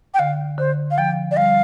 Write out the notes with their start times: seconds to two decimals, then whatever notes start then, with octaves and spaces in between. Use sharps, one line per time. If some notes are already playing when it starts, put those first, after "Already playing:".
0.14 G5
0.19 D3 F5
0.58 D3 C5
0.91 F5
0.98 F3 G5
1.31 D5
1.37 G3 F5